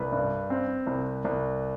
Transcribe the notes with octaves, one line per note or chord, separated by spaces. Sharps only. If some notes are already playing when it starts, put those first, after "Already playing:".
Already playing: C2 B4
G2
C4
C2
C2